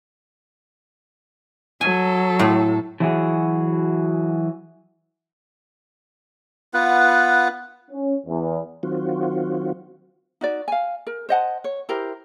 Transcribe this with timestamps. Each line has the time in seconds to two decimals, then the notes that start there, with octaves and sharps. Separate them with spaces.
1.81 F#3 A4 G#5
2.39 A2
3.00 E3 F#3 E4 F#4 G#4
6.74 B3 F4 B4 F#5
7.91 C#4
8.27 E2
8.83 D#3 F#3 C4 F4 F#4
10.41 D#4 F#4 D5
10.68 F5 G#5
11.07 A#4
11.29 C5 D#5 F#5 A5
11.64 C#5
11.89 E4 G4 A#4 C5